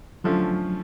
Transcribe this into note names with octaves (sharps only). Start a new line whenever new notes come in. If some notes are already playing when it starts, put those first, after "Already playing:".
D3 F3 F#3 A3 C#4 F4